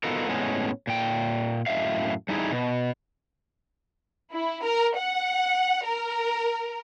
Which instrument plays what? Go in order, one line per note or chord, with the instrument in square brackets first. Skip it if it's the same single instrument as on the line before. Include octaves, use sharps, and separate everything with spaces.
[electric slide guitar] B3 D#4 F4 F#4 A4 A#4
A2 G#3 B3 C#4
A#2 G5
F#2 A2 E5 F5
G3 A3 D#4 E4 G#4
B2
[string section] E4
A#4
F#5
A#4